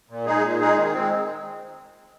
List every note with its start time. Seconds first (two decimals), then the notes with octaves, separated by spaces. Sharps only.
0.09 A#2
0.26 G#3 D#4 G#4
0.43 A#2
0.60 G#3 D#4 G#4
0.77 D#3
0.94 G#3 C4